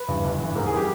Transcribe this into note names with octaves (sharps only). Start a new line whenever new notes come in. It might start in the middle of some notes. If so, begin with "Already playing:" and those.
Already playing: B4
G2 E3
G1
G2 E3
G#2 A#4
G#4
E3 G3 G4